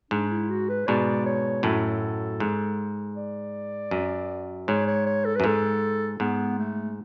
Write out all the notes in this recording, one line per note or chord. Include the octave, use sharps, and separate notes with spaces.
G#2 D4
E4
F#4
B4
G#2 B2 D5
C#5
F#2 A2 A4
G#2
D5
F#2
G#2 C#5
C#5
C#5
A4
F#2 B4
G#2 A4
G#2 B3
A3